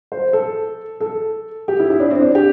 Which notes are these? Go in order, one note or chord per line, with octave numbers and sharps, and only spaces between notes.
C5
A4
A4
G4
E4
E4
D4
C4
D4
G4